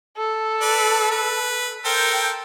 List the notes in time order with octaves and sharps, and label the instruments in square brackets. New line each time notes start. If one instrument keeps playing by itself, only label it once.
[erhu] A4
[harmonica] B4 D5
B4
[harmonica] A4 A#4 C5 [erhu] G5